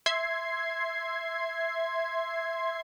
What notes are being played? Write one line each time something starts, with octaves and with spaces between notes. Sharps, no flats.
E5 C6 G#6 C7